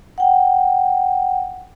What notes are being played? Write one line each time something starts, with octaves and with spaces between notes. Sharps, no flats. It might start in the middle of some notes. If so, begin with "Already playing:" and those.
F#5 G5